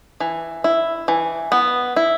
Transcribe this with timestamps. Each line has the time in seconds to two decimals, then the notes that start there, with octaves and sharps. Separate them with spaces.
0.20 E3
0.64 E4
1.08 E3
1.52 B3
1.96 E4